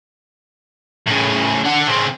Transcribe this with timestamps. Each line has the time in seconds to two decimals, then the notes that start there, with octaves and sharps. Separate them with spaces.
1.06 A2 C#3
1.64 D4 F#5
1.88 C#3 C4